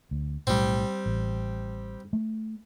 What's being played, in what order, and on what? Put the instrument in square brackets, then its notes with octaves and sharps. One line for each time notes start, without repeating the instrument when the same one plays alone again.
[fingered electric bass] D2
[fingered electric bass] B1 A2 [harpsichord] G3 C4
[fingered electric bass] A1
A3